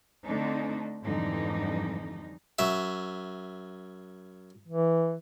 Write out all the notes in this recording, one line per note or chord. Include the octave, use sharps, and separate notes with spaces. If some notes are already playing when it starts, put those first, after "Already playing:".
D3 A3 C4 D4 D#4
F2 G#2 D3 E3 G3 D#4
F#2 E5
E3